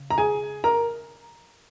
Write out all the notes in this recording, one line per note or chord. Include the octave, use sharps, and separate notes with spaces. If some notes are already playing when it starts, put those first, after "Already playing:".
Already playing: C#3
A#5
G#4 G#5
A#4 A#5